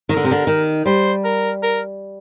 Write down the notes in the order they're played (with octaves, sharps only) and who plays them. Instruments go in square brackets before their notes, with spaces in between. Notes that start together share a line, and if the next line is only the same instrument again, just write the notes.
[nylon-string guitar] D#3 [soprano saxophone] A#4
[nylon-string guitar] D3
C3
D3
D#3
[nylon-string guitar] G3 [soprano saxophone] C5
[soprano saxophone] A#4
A#4